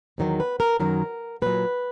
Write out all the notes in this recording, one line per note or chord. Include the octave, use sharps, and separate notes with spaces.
E2 D#3 F#3
B4
A#4
F#2 D#3 F#3 A#4
A#2 F#3 B4